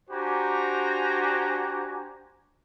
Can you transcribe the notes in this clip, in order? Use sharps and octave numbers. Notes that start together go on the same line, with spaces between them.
D4 F#4 G4 C5 G#5 A#5